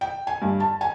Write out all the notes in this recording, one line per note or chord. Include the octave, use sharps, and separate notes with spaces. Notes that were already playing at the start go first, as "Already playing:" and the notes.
G5
G#5
G2
A5
G#5